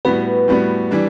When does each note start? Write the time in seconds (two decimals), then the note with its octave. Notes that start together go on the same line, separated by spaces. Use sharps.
0.05 A2 G3 B3 F#4 B4
0.48 A2 G3 B3 F#4
0.91 E3 G3 D4